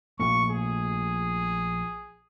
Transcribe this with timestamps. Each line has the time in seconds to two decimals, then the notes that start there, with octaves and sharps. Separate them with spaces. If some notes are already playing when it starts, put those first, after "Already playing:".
0.19 A#1 A#2 A3 C#6
0.50 G#4